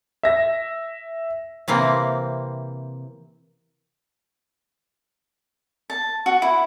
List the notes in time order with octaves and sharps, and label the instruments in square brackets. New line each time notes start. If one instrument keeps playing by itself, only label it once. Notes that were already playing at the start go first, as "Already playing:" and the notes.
[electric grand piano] E5 A#6
[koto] C3 E3 A#3 C4
[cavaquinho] A5
F#4
E4